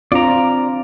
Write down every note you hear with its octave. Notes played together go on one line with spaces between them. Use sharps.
C4 D4 F4 D5 A#5